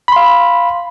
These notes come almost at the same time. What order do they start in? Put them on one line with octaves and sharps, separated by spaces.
B5 C6 F5